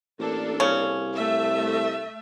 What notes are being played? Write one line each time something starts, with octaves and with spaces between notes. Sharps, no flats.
A1 A#3 D4 A4
C2 C#3 C#4
A3 E5